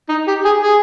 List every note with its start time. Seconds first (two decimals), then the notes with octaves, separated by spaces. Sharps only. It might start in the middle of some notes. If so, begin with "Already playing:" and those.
0.09 D#4
0.28 G4
0.45 G#4
0.63 G#4